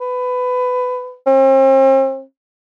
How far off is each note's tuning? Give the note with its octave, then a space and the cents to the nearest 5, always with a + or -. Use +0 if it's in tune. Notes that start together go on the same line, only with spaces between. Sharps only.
B4 +20
C4 +40